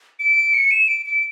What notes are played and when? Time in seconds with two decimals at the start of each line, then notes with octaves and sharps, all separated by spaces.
0.19 D7
0.54 C#7
0.71 E7
0.88 D7
1.06 D7